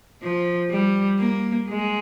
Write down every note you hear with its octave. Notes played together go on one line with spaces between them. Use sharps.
F3
G3
A#3
G#3